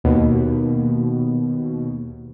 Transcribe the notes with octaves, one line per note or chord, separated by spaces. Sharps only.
D#2 B2